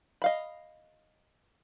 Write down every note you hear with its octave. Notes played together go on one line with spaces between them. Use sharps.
D#5 F5 B5